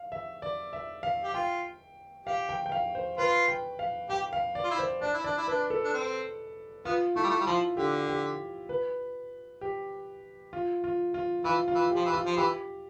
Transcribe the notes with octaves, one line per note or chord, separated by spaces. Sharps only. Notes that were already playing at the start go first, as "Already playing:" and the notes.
Already playing: F5
E5
D5
E5
F5
G4
F4 G5
G4 F5
G5
G5
F5
C5
F4 B4
G5
F5
G4 G5
F5
D5
F4
E4
C5
D4 D5
E4
D4 D5
E4
D4 B4
A4
D4
C4
B3 F4
A3 E4
G3
A3
G3
F3 F4
D3 G4
G4
B4
G4
F4
F4
F4
E3 F4
F4
E3
G4
F3
E3
F4
F3
E3 G4